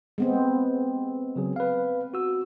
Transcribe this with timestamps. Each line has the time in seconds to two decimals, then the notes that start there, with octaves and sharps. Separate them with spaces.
0.18 G#3 B3 C4
1.36 C#3 F#3 G#4
1.56 B4 F5
2.14 F#4 E6